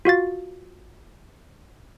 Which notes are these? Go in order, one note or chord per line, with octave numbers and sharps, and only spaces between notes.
F4 F#4 F5 A6